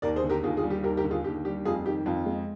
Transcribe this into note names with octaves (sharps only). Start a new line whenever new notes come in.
D#2 A#4 D5
G#4 C5
D3
G4 A#4
D#2 F4 G#4
F4 G#4
G3
G4
D#2 G4 A#4
G4 A#4
D3
F4 G#4
D#2 G4
G3 G4
F2 F4 G#4
D#3 G4
F2 F4
G#3